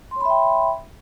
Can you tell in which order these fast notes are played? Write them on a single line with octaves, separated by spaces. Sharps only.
C6 C#5 B5 E5 G5